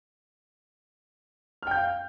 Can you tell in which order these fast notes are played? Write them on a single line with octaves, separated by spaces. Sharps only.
F6 G5 G6 F5